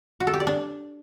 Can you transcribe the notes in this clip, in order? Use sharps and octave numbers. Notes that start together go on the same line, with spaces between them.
F#4
A4
G4
D5
D4